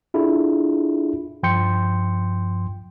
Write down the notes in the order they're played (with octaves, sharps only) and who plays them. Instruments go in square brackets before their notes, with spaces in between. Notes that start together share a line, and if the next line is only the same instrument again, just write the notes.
[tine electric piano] D4 E4 F4 G#4 A4
G2 F3 G5 C6 G6 C#7